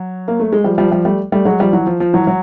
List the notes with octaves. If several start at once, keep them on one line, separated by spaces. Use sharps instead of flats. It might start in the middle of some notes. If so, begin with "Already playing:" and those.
Already playing: F#3
A#3
A3
G#3
F3 G3
F3 G3
F3 G3
G3 A3
G3 A3
F#3 G#3
F3 G3
E3 F#3
F3
F3
E3 F#3
F#3